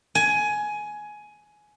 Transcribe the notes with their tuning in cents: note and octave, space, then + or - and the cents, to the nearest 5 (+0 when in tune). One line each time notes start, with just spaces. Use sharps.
G#5 +15